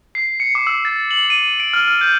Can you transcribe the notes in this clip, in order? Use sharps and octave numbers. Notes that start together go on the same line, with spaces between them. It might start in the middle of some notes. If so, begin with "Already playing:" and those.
C7
C#7
D6
E6
A6
F#7
D#7
D7
F6
F6
G6